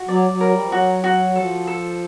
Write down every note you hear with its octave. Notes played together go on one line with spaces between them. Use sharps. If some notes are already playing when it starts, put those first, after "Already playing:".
Already playing: F#4
F#3 D5
F#3
A#4
G3
F3
F#3 F#4
F#4
F3 A4
A4